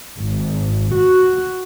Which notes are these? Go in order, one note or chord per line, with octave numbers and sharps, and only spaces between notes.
G#1
F#4